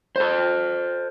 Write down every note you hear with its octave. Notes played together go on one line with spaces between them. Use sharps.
A4 C5